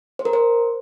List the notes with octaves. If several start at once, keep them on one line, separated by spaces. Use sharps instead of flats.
C5
A#4
C5